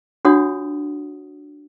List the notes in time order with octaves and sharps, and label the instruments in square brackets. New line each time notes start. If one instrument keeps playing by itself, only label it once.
[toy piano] D4 F4 F#4 C#5 F#5 D#6